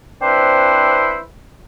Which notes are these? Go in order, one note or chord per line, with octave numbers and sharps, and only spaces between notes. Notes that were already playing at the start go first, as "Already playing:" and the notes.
C4 D4 E4 B4 C5